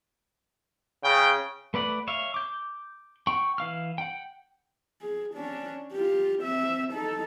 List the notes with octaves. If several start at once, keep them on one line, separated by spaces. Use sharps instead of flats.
C#3 G5
A3 B4 D5 F#5
C#5 E5 F5
D6 G6
F#5 G5 C#6
E3 F5 F6
F#5 G5
G#4
C#4 D4
F4 G4
C4 E5
D#4 A4